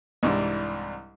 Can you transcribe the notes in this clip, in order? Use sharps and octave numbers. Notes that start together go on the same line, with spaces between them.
C2 G#2 E3 G3 D4